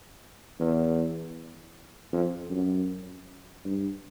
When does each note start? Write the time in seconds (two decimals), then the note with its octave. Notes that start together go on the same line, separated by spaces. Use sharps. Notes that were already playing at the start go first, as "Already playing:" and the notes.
0.60 E2
2.13 F2
2.50 F#2
3.65 G2